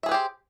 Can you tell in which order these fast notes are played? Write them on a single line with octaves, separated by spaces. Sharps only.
E5 G#4 B4 G4 C5